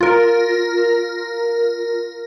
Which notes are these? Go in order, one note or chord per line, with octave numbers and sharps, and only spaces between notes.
F4 A#4